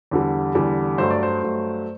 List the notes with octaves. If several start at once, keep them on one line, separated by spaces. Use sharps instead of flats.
E2 D3 G3
E2 D3 G3
G2 F#3 A3 C5
D5
C5
G2 F#3 A3